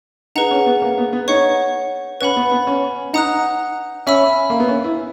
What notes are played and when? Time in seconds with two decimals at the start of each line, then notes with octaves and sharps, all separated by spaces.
0.35 D#4 G#4 B4 F#5 A#5
0.51 C#4
0.66 B3
0.82 A#3
0.98 B3
1.13 B3
1.28 D#4 C#5 F#5 C#6
2.21 C#4 B4 F#5 B5
2.36 B3
2.51 B3
2.67 C#4
3.13 D#4 F#5 A#5 D#6 F#6
4.07 C#4 E5 B5 E6
4.50 A#3
4.60 B3
4.69 C#4
4.84 E4